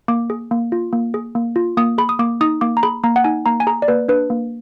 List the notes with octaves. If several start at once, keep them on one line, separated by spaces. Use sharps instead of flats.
A#3 D6
G#4
A#3
F4
A#3
G#4
A#3
F4
A#3 D#6
G#4 B5
D#6
A#3 D6
D#4 D#6
A#3 D6
A#5
G#4 B5
A#3 A#5
F#5
D#4 G#5
A#3 A#5
G#5
G#4 A#5
D5
A#3 B4
D4 B4
A#3